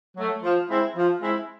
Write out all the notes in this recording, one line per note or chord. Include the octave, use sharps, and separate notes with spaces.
F#3 A3
F3
G#3 C4 E4
F3
G#3 C4 E4